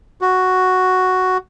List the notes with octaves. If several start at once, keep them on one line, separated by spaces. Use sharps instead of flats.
F#4